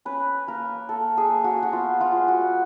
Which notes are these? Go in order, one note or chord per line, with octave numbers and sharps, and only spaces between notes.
C#4 B4
A#3 A#4
A#3 A4
G#4
A#3
F#4
F#4
B3 F4
F4
G#3
F#4